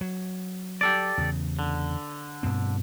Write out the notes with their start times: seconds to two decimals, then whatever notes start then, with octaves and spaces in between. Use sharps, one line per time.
0.01 F#3
0.81 G4 A4 D5
1.18 E2 C#3
1.59 D3
2.43 G2 B2 C4